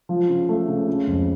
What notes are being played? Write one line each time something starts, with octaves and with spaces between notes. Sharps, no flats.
F3
C#3
A3
C#3
C#3
F2